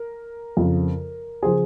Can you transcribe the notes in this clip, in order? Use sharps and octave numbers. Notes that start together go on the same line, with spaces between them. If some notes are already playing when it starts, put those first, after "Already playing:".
Already playing: A#4
F2 C#3 F3
C#3 F3 G#4 C5